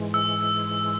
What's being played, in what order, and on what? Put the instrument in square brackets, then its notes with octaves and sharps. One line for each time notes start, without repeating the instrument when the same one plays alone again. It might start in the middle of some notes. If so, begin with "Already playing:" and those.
Already playing: [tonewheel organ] G#2 E3 G#3
[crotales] E6